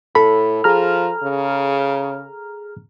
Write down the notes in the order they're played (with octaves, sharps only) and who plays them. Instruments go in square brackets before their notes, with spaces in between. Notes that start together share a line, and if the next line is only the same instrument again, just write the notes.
[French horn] A2 [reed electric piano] A4 B5
[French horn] F3 [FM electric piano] G#4 A#5 F6
[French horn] C#3